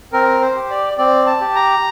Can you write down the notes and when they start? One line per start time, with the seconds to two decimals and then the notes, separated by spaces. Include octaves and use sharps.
0.13 C4 A#4
0.41 C5
0.55 G4
0.70 D5
0.98 C4 D5
1.26 A5
1.41 G4
1.55 A#5